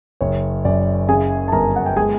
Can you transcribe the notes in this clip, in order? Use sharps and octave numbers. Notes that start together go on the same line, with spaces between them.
F#1 C#5
F#2 D5
C#3 G#4 G#5
A5
G1 A#4 A#5
F#5
G5
G#3 G#4 G#5